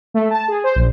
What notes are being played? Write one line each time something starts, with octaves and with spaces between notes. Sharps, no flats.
A3
A5
G#4
C5
A#1